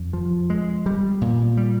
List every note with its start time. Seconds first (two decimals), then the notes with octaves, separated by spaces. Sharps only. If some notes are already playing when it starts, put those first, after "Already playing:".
Already playing: F2
0.13 F3
0.50 G#3
0.86 G3
1.21 A#2
1.57 G3